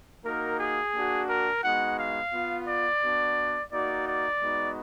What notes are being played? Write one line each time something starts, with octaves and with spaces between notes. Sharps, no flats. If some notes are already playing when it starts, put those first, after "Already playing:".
A#3 D#4 F#4 A#4
G#4
A#3 D4 F#4
A#4
G#3 B3 D#4 F#4 F#5
F5
B3 F4
D5
B3 D4 F#4
A#3 D#4 F#4 D5
D5
G#3 B3 D#4 F#4